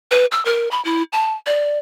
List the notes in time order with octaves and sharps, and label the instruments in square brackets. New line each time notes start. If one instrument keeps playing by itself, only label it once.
[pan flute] B4
E6
A#4
B5
E4
A5
D5